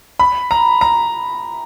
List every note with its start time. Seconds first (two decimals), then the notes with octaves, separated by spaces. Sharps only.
0.19 B5
0.51 A#5
0.81 A#5